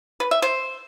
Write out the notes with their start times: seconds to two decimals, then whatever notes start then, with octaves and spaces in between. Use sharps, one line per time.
0.20 B4
0.31 E5
0.42 C5